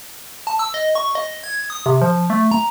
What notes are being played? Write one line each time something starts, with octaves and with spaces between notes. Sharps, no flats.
A5
E6
D#5
C#6
D#5
G#6
D#6
C3
F3
A3
A#5